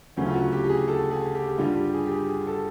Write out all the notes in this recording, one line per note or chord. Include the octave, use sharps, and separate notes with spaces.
D2 C#3 F#3 A3 C#4
F4
F#4
G4
G4
G#4
A4
G#4
G4
G2 D3 G3 F4
G4
G#4
G4
G#4
G#4
A4